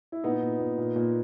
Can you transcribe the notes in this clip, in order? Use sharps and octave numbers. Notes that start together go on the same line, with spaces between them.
E4
A#2 B3 D#4
A#2
A#2
A#2
A#2